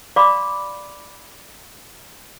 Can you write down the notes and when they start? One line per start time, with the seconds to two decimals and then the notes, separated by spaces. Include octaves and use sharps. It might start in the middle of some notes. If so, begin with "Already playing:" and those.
0.16 D5 F5 B5 C6 D6